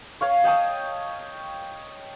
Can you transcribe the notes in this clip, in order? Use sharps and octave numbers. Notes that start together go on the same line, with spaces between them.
C#5 F5 C#6
D#5 G5 A5 D#6